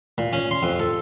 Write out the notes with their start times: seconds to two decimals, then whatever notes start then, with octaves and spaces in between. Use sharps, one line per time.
0.18 A#2
0.33 C#4
0.51 C6
0.63 F2
0.80 A4